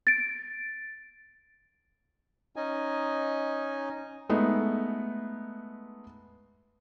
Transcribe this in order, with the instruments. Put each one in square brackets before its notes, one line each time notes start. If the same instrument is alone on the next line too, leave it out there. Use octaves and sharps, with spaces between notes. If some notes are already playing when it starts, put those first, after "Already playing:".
[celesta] A6 D7
[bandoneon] C#4 D#4 D#5 G#5
[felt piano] G#3 A3 B3 D#4